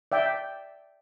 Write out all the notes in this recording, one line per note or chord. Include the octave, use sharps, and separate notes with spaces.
D5 E5 G5